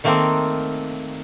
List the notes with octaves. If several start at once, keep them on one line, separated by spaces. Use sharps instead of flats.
D#3 A3 A#3 C4